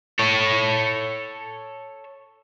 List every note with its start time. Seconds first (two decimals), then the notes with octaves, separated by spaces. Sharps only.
0.19 A4 C#5